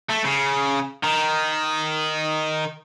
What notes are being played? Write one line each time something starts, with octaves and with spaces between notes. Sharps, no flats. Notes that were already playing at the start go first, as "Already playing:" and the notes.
A3
C#3
D#3